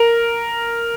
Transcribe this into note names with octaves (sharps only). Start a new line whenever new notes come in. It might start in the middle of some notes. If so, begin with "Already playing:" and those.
Already playing: A#4